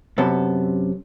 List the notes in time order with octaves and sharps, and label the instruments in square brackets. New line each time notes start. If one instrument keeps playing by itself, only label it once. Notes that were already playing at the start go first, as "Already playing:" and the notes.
[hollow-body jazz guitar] F#2 C3 B3 A4